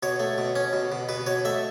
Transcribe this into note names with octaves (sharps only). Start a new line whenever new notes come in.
B2 C#5
A3
B2
C#4
B2
B2
B2 B4
B2 C#5
A3 E5